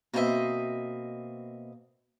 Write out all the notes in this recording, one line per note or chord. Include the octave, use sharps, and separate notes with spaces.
B2 A#3 C4 F#4 D#5 E5